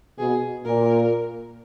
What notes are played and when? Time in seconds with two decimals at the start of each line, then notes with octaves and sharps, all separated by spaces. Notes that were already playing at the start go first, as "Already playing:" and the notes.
0.18 B2 G#4
0.64 A#2 A#4